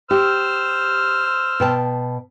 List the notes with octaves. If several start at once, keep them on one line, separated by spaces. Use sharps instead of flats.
G4 C5 E6 F6
B2 G5 A5